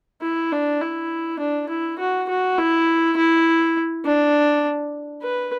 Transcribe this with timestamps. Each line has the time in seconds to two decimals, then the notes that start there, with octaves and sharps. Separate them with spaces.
0.22 E4
0.52 D4
0.81 E4
1.39 D4
1.69 E4
1.99 F#4
2.29 F#4
2.58 E4
3.17 E4
4.05 D4
5.23 B4